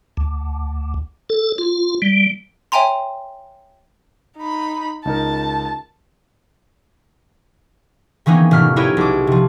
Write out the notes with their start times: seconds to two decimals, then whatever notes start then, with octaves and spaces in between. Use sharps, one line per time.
0.17 D2
1.30 A4
1.58 F4
2.02 G3
2.72 C#5 E5 G5 G#5 A#5 C6
4.38 D#4 B5
5.05 C#2 D#4 A#4 A5
8.26 D#3 E3 A#3 B3 C#4 D#4
8.51 F1 A2 F6 B6
8.76 D#4 E4 G4 A#4 B4 C#5
8.97 B1 D6
9.27 C3 F3